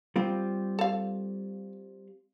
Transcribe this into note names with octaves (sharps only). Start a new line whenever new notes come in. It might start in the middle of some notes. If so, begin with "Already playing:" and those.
G3 C4 F4
A4 F5